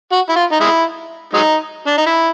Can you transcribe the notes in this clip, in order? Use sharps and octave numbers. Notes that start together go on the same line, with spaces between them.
F#4
E4
F4
D#4
G#3 E4
F#3 G#3 D#4
D4
D#4
E4